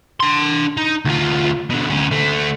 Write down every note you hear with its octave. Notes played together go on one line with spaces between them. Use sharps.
D4 C6
D#4
D2 F4
B2 D3
D2 C#4
D3 A3